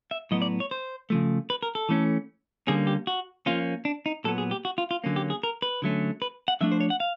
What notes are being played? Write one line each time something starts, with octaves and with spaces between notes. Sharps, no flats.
E5
A2 F#3 B3 D#5
D5
C#5
C5
C#3 F3 A3
B4
A#4
A4
E3 A3 C#4
D3 G3 A#3 C#4 G#4
G4
F#4
F3 A#3 C#4 F4
D4
D#4
A#2 F#3 B3 A4
G#4
G4
F#4
F4
F4
D3 F#3 A#3 C#4
G4
G#4
A#4
B4
D3 F#3 A3 C#4
B4
F#5
D3 F3 A3 D4 E5
C5
C#5
F#5
F5